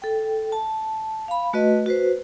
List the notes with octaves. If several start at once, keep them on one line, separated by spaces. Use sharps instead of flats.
A4 G5
A5
F5 B5
A3 F#4 B4 D#5
F#4 B4 C5